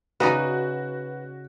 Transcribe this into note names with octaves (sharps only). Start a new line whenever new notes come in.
C#3 D#4 F#4 B4 D5